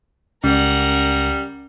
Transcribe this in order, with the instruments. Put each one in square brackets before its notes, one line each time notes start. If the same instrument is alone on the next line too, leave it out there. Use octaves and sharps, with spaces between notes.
[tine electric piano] C#2 [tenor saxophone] G3 [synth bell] C#4 [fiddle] A#4 F#5